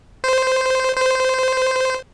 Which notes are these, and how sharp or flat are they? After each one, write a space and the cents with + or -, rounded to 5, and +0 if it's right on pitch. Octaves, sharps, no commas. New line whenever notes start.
C5 -10
C5 -15